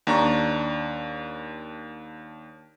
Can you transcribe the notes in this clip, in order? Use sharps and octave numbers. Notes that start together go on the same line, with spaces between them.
D#2 D4 A#5 C#6